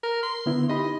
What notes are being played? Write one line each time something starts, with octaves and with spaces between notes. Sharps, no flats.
A#4
C6
D3 B3 E4
D#4 G4 D#5 B5